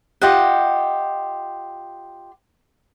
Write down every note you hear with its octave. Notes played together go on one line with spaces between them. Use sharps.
F4 G4 D#5 F#5